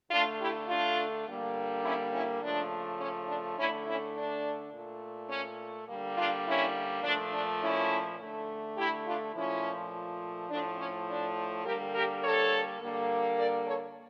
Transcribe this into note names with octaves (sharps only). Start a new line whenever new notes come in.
D3 A3 D4 F4
E4 G4
D4 F4
D3 G3 A#3
C#4 E4
C#4 E4
C#3 F3 A3 D4
C#4
D4
D3 A3 C#4 E4
C#4 E4
D4
A#2 A3
C#4
D3 G3 A#3
D4 F4
C#4 E4
A#2 F3 A3 D4
D4
C#4 E4
D3 A3
E4 G4
D4 F4
A#2 F3 A3 C#4 E4
A2 F3 A3 D4
C#4
D4
D3 G3 A#3 G4 A#4
G4 A#4
A4 C#5
D3 G3 A#3
A#4 D5
A4 C#5